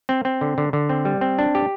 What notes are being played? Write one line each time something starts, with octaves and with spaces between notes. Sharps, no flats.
C4
C4
D3
D3
D3
C4
G3
C4
D4
G4